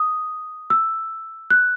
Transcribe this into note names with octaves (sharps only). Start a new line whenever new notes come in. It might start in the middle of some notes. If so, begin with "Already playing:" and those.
Already playing: D#6
E6
F#6